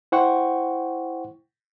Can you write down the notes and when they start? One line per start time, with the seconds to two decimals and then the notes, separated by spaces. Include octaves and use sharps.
0.12 E4 C5 F#5 G5 C#6